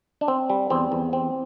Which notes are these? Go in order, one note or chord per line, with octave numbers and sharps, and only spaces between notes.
D4
C4
G3
E2 C4
E2
C4